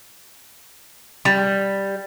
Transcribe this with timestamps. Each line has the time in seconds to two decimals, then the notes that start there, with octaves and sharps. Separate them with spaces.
1.25 G3